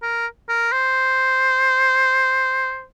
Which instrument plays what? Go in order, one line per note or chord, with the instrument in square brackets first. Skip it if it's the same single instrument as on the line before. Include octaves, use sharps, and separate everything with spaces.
[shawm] A#4
A#4
C5